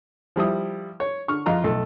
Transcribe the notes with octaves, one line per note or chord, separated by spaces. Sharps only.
F3 G3 E4 D#6
C#5
D3 C#6 F6
F2 F4 D#5 A#5
B1 A3